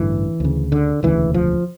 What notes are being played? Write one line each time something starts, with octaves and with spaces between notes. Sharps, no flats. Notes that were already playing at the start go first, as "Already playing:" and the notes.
Already playing: A1 G2 D3 E3
D2 C#3
D3
E1 D2 C#3 E3
F3